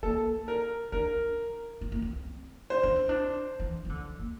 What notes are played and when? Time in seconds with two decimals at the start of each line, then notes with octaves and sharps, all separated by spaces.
0.03 A#3 A4
0.48 A#4
0.92 D4 A#4
1.81 C4
1.92 A#3
2.02 C4
2.70 C5
2.83 D4
2.96 C4
3.09 D4
3.60 E3
3.85 E3
3.89 D3
4.19 A#3